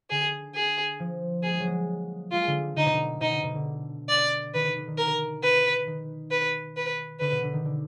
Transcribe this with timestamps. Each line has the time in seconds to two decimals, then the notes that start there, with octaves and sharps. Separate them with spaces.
0.10 D3 G#4
0.55 G#4
1.00 F3
1.43 A#3 G#4
1.51 G#3
1.59 F#3
1.67 G#3
2.32 G#3 F4
2.47 D3
2.76 D3 D#4
2.85 B2
2.92 D3
3.20 B2 D#4
3.33 D3
3.43 B2
3.55 D3
4.09 D5
4.54 D#3 B4
4.65 D3
4.76 D3
4.87 D#3
4.98 A#4
5.43 B4
5.87 D#3
6.31 B4
6.77 B4
7.20 D3 B4
7.32 B2
7.43 D3
7.53 D#3
7.65 D3